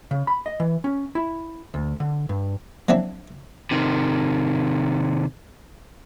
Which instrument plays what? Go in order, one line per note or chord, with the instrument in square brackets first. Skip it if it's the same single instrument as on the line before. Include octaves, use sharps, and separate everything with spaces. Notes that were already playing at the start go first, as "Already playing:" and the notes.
[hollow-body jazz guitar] C#3
B5
D#5
E3
C#4
E4
D2
D3
G2
[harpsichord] F3 F#3 C4 D4 E4
[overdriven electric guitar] C3 D#3